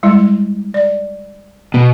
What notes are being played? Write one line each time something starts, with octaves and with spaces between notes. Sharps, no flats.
G3 G#3 E4
D5
B2